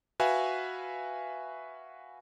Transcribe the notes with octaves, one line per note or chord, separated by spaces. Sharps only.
F#4 B4 E5 F5 G#5